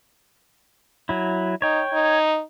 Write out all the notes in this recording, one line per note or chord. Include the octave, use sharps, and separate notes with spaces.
F#3 E4
D#4 C#5 G5
D#4